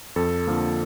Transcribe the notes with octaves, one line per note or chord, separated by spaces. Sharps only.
F2 A4
D3 F3 A#3